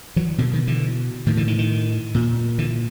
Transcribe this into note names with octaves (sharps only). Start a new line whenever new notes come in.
E3 F#3
B2 D3
D#3
D3 E3
A2 D#3
D3 E3
D#3
D#3
A#2
D3 E3